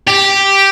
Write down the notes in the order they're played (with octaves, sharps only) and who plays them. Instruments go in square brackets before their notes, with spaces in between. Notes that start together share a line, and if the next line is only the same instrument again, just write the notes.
[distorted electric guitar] G4